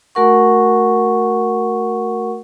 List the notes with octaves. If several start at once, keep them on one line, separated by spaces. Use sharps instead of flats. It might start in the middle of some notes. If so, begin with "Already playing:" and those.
A3 F#4 A#4 F#5 C#6